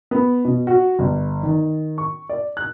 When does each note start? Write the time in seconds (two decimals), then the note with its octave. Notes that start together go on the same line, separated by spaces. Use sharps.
0.11 B3
0.45 B2
0.67 F#4
0.99 G1
1.43 D#3
1.98 C#6
2.29 D5
2.57 F#6